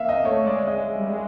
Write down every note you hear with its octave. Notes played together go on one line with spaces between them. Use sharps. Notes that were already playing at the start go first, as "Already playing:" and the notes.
Already playing: A#3 E5 F5
D#5
A3 C#5
G#3 D5
G#3 D#5
G#3
G3
G#3